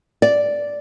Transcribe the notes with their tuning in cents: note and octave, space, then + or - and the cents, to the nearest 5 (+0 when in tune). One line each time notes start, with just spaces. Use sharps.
D5 -5